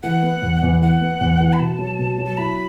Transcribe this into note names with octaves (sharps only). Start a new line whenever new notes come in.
E3 F#5
B3
E2
E2
E3 F#5
B3
E2
E3
B5
B2 A5
F#3
B2
F#3
A5
E4 B5